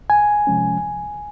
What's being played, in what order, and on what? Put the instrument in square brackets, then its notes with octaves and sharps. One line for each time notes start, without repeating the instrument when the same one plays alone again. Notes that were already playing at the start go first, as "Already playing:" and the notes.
[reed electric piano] C2 G#5
C3 F3 G#3 C#4
C2